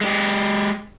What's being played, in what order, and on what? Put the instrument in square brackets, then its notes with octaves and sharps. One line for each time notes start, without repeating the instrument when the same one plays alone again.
[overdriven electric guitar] G#3 G4